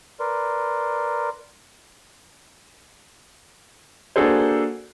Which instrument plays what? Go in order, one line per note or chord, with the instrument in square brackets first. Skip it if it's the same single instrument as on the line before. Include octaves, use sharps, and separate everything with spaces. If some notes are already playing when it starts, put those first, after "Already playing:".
[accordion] A#4 B4 D5 C6
[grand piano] A#3 D4 F#4 G#4 A4 C5